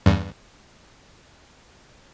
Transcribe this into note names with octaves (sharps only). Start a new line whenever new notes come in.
E2 G2